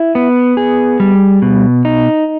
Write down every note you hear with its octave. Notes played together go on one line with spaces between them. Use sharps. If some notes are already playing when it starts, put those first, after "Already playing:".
Already playing: E4
B3
G#4
G3
B2
D#4